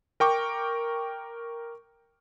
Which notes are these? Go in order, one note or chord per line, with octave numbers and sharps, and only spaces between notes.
A#4 G5 C#6 D6